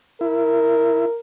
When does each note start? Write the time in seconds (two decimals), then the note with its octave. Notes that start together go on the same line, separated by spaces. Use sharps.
0.21 E4 A#4